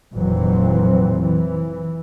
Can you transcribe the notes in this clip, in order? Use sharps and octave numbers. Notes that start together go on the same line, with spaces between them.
F1 F2 A#2 E3 F#3 C4
E3